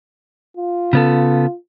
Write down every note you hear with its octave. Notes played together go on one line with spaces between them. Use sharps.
F4
C#3 B3 A4